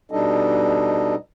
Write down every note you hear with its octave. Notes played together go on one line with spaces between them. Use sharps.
B2 G3 D4 D#4 A4 D#5